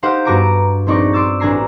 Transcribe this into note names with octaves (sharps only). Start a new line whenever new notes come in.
D#4 G4 C5 F5 F#5
G2 B3 F#4 A#5 D6 D7
A#1 C4 D#4 D5 C#6 A#6
C6 D6 E6 A6
A1 D4 G#5 A#5 C7